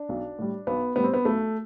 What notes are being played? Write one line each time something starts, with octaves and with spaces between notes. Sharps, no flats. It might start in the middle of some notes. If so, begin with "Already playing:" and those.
Already playing: D4
B1
A2 G3
B1 B3
A2 G3 B3
C4
B3
B1 A3